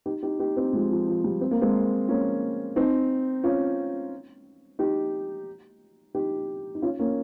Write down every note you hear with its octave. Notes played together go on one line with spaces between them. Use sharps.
D#4 G4
D#4 G4
D#4 G4
C4 D#4
F3 G#3
F3
F3
G3
C4
A#3
G#3 C4
A#3 C#4
C4 D#4
C#4 F4
D#4 G4
D#4 G4
D#4
C#4 F4
A#3 C#4